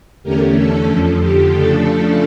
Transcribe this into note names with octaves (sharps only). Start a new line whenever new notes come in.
E2 D3 A3 C#4 G4 A#4
A4
F2 D3 F3
G4
C#3 F3 A3 D4 A4